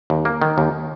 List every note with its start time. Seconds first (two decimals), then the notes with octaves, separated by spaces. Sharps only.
0.10 D#2
0.25 A#3
0.42 D#3
0.58 D#2